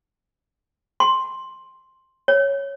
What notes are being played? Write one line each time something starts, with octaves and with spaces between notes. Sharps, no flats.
C6
C#5